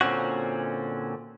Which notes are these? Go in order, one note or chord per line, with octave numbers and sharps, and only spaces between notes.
A#2 D3 C4 C#4 F#4